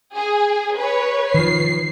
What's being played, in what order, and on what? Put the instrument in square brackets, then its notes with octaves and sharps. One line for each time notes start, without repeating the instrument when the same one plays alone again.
[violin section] G#4
B4 C#5
[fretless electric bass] D#3 F3 [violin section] C7